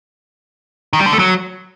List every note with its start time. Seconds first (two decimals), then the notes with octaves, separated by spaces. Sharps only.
0.93 D#3
1.00 G3
1.06 D3
1.13 A3
1.19 F#3